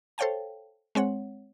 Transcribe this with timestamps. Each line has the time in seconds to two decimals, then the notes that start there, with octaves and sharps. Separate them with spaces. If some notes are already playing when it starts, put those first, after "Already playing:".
0.18 A4 C5 C#5 F5 G5 A5
0.95 G#3 C4 C#5 F#5